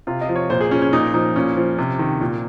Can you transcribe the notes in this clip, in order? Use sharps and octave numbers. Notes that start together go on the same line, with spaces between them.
C3 F4
D#5
F3
C#5
A#2 C5
G#4
F3 C#4
C#4
A#2 D#4
F3 D#4
A#2 C#4
F3
C3
D#3
A#2